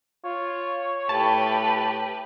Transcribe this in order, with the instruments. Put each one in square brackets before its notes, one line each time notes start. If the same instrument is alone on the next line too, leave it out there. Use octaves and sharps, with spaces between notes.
[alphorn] F4 [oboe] C#5
[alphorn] A2 [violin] G4 B4 [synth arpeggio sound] A5